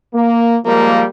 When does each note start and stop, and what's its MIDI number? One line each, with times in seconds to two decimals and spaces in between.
0.14 0.56 58
0.66 1.04 53
0.66 1.04 55
0.66 1.04 56
0.66 1.04 58